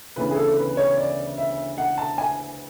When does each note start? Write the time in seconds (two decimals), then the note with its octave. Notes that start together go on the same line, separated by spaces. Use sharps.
0.16 D2 C#3 E3 B3 B4
0.31 G#4
0.36 A4
0.56 B4
0.77 C#5
0.97 D5
1.38 E5
1.78 F#5
1.98 A5
2.18 G#5